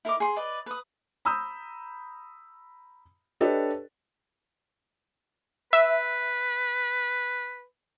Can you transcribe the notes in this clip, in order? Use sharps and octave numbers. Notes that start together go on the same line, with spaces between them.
E4 A#4 D#5 D6
G#4 C6
B4 D5 D#5
B4 D#6
A#5 B5 D#6 E6 G6
D4 G4 A4 B4 C#5 D#5
B4 E5